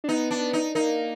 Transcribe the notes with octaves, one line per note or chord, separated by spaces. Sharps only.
D4
B3 D#4
D4
D#4
A#3 D#4